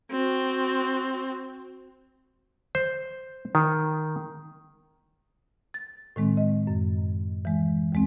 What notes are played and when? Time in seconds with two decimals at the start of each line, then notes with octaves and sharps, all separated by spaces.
0.11 C4 F#4
2.75 C5
3.55 D#3
5.74 A6
6.16 A2 D#3 G#3 C4
6.37 D#5
6.67 F#2
7.45 E3 G#3
7.92 D#2 G#3 C4